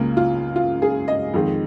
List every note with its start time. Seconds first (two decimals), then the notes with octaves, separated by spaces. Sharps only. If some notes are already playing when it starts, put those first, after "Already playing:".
Already playing: C#2 C#3 A#3
0.17 F4
0.56 F4
0.82 G#4
1.08 D#5
1.34 F2 D#3 G#3